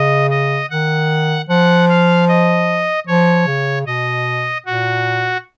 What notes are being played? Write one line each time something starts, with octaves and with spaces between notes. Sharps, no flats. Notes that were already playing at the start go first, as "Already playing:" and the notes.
Already playing: C#3 D#5
D#5
D#3 F#5
F3 F#5
F5
D#5
F3 C#5
C#3
B2 D#5
A#2 F#4